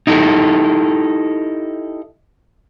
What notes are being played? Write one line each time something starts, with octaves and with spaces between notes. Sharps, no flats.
D#4 E4 G4 A4